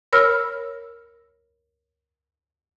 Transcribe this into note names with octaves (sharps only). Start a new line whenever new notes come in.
A#4 C#5 B5 E6 F6